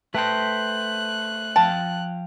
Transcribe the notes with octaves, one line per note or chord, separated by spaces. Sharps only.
A3 B4 C5 G5 A5 F#6
F3 F5 G5 A5